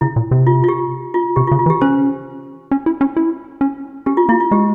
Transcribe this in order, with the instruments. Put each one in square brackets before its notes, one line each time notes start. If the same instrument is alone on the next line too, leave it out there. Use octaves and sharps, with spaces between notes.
[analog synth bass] C#3 [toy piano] E4
[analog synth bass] A#2
C3
[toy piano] F4
F4
G4
F4
[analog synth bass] C3 [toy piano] G4
[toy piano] F4
[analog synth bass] C#3
[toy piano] F4
[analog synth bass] E3
[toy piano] G4
[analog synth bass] C#4 [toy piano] C5
[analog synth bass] C#4
E4
C#4
E4
C#4
[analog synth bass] C#4 [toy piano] G4
[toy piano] F4
[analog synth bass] A#3 [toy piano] E4
[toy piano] F4
[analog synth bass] G#3 [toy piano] G4